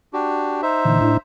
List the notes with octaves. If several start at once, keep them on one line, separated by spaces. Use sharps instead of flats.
D4 F#4 G4
D#4 C5 E5
A#2 D3 E3
A2 D4 E4